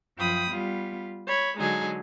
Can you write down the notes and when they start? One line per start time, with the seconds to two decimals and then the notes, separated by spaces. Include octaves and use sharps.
0.17 F#2 F3 F4 G5 B5 D#6
0.51 G3 B3 F4
1.27 C#5 B5
1.58 D3 F#3 G#3 D#4 G#4